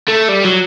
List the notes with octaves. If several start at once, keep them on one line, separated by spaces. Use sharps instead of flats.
A3
G3
F#3